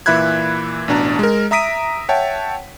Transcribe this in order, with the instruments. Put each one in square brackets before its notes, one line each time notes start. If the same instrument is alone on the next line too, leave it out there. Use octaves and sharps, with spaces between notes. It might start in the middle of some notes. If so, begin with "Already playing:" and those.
[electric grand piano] A#2 E3 E5 B5 F#6 G#6
A1 B2 D4 A5 A#5
G#3 A#4
E5 A#5 D#6 B6 D7 D#7
C#5 E5 F#5 G5 A5